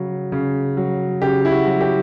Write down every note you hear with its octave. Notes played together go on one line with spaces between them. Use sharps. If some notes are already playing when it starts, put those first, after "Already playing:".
Already playing: C#3 F#3
C#3
F#3
C#3 G4
E4
F#4
F#3
G4